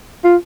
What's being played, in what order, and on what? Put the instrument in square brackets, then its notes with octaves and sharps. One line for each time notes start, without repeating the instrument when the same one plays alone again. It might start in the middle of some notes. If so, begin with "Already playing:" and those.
[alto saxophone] F4